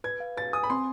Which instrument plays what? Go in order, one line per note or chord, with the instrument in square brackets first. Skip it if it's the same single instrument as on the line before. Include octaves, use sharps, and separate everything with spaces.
[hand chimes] B4 [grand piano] G#6
[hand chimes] F5
[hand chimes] B4 [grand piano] A6
[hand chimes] G#5 [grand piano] D#6
[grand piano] B5
[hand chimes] C4 [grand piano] C6